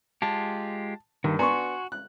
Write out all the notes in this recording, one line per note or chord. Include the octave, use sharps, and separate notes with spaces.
G#3 F4 G4 A5
G2 D#3 A#3
B3 D4 F#4 G#5 A#5 C6 C#6
F#6